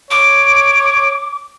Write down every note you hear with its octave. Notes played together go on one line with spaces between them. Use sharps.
C#5 D6 D7